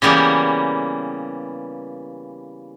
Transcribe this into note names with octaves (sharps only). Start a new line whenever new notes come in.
C#3 E3 G3 A#3 B3